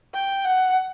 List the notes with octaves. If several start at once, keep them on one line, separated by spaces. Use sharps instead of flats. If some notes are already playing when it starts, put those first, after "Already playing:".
G5
F#5